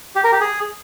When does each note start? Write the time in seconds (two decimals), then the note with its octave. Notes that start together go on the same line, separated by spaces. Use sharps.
0.16 G4
0.24 A#4
0.32 G4
0.41 G#4